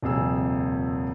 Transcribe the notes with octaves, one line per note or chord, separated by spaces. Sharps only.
D#1 F2 C3 G#4 E6